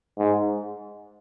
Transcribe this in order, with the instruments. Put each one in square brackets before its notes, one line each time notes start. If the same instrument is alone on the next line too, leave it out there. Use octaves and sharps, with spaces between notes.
[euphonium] G#2